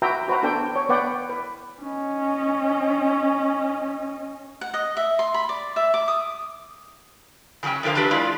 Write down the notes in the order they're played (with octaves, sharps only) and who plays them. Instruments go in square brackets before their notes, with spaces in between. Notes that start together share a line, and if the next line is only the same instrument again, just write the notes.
[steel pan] F#4 B4 E5 G5 A#5
F#4 B4 C5 A#5
B3 D4 A4 C5 G5
C#5
B3 B4 D5 F#5 G5
B4
[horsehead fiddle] C#4 D#5
[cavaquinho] F#5
D#5
E5
C6
B5
D5
E5
D6
D#6
[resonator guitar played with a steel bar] C#3 F#3 G#3 C#4 G5
F2 D3 F3 A#4 F5
E3 F#3 D4 G4 B4
G#3 E4 F4 D5